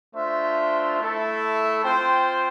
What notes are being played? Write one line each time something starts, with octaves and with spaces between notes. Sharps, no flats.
A3 D4 F4 C5 E5
A3 E4 A4
C4 F4 C5 G5